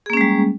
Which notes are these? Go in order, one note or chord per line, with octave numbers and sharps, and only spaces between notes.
G3 G#3 A#3 C#4 G#4